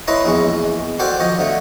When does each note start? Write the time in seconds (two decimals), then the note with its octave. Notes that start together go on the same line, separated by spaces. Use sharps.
0.07 E4 B4 C#5 D#5 A#5 C6
0.25 A#1 E2 G#3 C#6
0.99 F#4 A4 C5 D5 F5 G5
1.20 F3 D#5 C#6
1.39 D3 A3